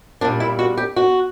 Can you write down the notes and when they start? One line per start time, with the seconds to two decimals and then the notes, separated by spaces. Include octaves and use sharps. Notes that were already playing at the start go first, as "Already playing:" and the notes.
0.21 A#2 G3 D4
0.40 E4
0.59 F#4
0.77 G4
0.96 F#4